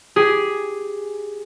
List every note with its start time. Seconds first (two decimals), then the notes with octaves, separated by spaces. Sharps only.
0.16 G4 G#4